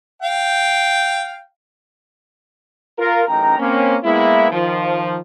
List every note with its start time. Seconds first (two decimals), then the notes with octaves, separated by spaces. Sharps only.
0.22 F5 G5
2.98 F4 A#4
3.28 A1 F#2 D#4 G5 A#5
3.59 A#3 C4 C#4
4.04 G#3 A#3 B3 E4
4.52 D#3 F3